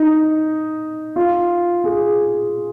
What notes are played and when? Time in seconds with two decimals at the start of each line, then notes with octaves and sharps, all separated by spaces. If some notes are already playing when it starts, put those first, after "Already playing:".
Already playing: D#4
1.16 F4
1.84 G#4